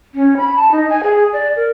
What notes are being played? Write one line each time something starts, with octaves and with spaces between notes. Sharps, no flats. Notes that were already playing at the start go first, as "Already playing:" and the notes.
C#4
B5
A5
D#4
G#5
G#4
D5
A#4